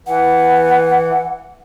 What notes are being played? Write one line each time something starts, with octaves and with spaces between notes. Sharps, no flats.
E3 F#5